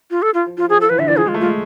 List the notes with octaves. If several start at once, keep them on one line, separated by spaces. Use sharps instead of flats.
F4
A4
F4
F3
F3 F4
F3 G#4
A4
F3
E3 B4
D3 E5
E3 D5
F3 G#4
G#3 F4
A3
G#3 F4